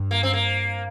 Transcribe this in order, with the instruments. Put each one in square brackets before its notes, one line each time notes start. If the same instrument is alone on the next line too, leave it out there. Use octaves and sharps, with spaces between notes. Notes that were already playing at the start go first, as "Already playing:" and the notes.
Already playing: [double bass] G2
[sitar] A#3
C4
A#3